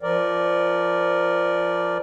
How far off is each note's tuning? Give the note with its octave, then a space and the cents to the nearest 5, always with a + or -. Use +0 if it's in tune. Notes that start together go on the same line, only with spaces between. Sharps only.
F3 -10 A#4 +0 D5 +0